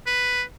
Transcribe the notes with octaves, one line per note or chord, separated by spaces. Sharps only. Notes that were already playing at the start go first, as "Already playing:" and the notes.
B4